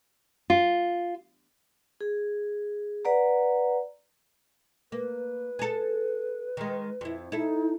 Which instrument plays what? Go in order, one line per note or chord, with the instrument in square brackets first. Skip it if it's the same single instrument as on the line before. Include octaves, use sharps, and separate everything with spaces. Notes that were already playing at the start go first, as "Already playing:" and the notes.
[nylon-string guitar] F4
[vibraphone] G#4
B4 D5 F#5 A#5
[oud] A#3 [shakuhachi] B4
[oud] G#4 A4
D#3 G#3
F2 E4
[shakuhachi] D#4 [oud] E4 A4